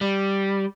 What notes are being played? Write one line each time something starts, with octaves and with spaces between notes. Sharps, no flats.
G3